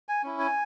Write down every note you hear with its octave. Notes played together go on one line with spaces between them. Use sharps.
G#5
C#4 E4
G#5